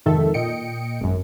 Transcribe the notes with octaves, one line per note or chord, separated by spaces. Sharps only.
F2 G#2 C3 D#3 A4 E5
A#2 D#5 G5 C#7 D7
G#1 F#2